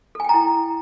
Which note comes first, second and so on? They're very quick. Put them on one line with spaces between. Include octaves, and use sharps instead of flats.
A4 G#5 G5 A#5 E4